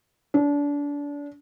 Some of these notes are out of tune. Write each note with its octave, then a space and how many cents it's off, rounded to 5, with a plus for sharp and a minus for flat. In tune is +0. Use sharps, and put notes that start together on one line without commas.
D4 -30